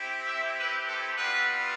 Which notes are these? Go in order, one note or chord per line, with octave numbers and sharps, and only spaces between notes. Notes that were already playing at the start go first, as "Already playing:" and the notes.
Already playing: C4 E4 G4
E5
B4
A4
G3 B3 F4 B4